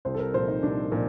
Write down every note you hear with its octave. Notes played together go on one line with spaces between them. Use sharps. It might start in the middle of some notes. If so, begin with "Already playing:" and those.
C2 C5
A4
A#4
A#2 F3 C5
D#4
C2 D4
A#2 F3